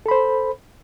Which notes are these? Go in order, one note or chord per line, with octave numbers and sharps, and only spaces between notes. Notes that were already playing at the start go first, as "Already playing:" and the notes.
A4 C5 B5